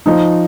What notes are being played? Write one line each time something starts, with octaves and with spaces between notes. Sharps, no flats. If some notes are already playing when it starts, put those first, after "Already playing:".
F3 D#4